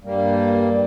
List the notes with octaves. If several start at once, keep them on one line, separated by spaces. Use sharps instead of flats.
G2 G3 A#3